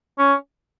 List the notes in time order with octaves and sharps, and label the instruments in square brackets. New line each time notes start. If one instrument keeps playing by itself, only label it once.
[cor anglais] C#4